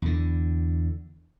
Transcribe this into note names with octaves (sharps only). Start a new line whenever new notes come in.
E2 D3